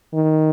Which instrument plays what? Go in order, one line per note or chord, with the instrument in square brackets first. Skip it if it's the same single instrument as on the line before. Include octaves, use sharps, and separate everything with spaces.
[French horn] D#3